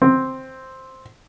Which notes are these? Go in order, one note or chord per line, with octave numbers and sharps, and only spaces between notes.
C4